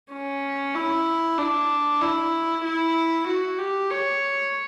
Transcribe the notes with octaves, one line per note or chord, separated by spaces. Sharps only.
C#4
E4
D4
E4
E4
F#4
G4
C#5